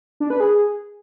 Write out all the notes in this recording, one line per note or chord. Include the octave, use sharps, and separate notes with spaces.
D4
B4
G#4